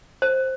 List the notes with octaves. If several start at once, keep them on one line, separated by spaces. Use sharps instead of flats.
C5